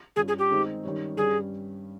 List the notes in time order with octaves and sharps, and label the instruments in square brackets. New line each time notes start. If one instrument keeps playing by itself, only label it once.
[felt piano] G2 G3 C#4 F4 [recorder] G#4
[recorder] G#4
G4
[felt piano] D#3 G#3 C4 D#4 G#4
D#3 G3 C#4 G4 C#5
[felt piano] G2 G3 C#4 G4 C#5 [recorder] G#4